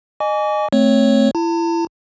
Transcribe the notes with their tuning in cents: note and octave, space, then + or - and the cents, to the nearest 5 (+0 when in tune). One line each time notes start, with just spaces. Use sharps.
D#5 -25 G#5 +5 D6 -40
A3 +0 C4 +0 C#5 +0
E4 +30 A5 +45